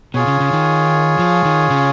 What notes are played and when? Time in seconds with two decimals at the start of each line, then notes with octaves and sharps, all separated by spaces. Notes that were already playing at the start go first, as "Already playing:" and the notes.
0.14 B2 F4 G#4 C#5
0.27 C#3
0.40 C#3
0.53 D#3
1.19 F3
1.45 D#3
1.70 C#3